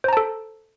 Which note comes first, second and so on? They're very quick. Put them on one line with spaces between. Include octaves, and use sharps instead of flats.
C5 A#5 A5 A4